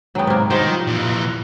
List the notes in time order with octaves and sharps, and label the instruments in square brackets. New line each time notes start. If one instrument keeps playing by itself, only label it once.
[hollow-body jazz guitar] G#2 G5 [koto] F#3 B3
[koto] C3 A#3
[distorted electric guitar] D#3 [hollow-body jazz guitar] G3 D#4 F#4 [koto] G4 C5
[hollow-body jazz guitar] F3
[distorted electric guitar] A#2 E3